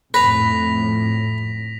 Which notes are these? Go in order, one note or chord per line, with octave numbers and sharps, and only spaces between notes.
F2 A2 B4 A#6 B6 F7